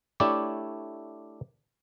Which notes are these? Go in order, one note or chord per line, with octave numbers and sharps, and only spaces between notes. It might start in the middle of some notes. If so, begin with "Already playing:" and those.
A3 D4 E4 G4 C#5 D5